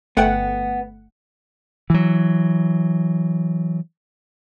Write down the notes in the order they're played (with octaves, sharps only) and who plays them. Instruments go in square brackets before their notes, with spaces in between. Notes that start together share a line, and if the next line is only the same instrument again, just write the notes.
[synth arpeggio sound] G1 A3 F#5 [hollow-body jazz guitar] B3 G5
[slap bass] E3 F#3